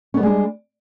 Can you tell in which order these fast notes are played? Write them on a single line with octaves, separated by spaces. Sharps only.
C#4 B3 G3 G#3 D4